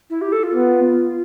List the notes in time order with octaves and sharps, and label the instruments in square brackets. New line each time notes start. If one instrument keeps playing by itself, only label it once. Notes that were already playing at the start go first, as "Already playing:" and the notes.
[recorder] E4
G4
A4
F4
[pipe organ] B3